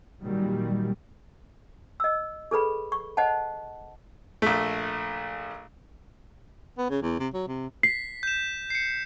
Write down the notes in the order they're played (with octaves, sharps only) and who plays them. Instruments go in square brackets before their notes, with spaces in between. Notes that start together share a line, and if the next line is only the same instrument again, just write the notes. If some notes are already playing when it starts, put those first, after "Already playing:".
[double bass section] A#2 D#3 F#3 G3
[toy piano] D#5 E6
G#4 A4 B4 B5
C#6
C5 D#5 F#5 A5
[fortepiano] A#1 A3
[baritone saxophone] B3
C#3
E2
C3
F#3
C3
[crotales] B6 [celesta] C7
[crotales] G6 E7
C7 C#7